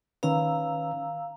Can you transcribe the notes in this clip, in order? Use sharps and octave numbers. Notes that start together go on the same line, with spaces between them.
D#3 C#4 B4 F5 A#5 E6